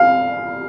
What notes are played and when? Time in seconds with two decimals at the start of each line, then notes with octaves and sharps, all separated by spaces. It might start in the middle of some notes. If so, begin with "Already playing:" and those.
Already playing: F5